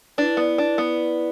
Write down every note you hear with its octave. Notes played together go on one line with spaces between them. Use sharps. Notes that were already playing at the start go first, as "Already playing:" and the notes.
D4 E4 B4 D5
B3
D4
B3